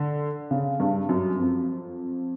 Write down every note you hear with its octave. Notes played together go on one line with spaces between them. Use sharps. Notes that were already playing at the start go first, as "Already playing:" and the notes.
Already playing: D3
C#3
G2
F#2
F2